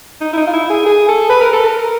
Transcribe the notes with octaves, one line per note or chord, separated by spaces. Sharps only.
D#4
E4
D#4
F4
E4
G#4
G#4
A4
B4
A#4
A4
A#4